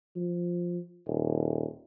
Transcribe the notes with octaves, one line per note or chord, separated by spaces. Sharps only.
F3
D#1